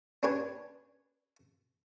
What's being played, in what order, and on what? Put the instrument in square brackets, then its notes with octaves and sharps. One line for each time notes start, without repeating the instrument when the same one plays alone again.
[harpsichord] C#4 D4 G4 B4 C#5 G#5